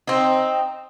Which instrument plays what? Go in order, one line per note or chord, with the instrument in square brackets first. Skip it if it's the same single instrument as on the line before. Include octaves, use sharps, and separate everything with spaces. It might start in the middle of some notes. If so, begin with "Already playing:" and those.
[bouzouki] C4 D#4